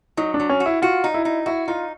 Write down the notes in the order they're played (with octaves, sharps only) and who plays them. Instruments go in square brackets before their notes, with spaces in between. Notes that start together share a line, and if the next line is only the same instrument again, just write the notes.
[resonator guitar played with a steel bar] F#3 [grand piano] D#4
[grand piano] D4
[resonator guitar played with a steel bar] F#3
[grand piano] C#4
[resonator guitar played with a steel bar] F#4
[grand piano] E4
[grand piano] F4 [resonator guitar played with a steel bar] F#4
[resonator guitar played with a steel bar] D#4
[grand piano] E4
[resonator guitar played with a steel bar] D#4
[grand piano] E4 [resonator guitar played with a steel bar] F#4
[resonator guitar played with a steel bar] D#4 [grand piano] F4